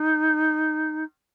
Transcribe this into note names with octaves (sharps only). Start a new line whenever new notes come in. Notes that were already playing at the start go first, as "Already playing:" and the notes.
Already playing: D#4